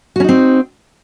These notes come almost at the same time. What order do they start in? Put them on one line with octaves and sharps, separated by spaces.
F#4 C#4 D#4 C4